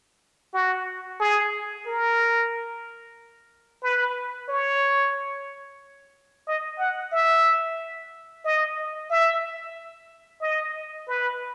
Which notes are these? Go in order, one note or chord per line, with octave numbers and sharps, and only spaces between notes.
F#4
G#4
A#4
B4
C#5
D#5
F#5
E5
D#5
E5
D#5
B4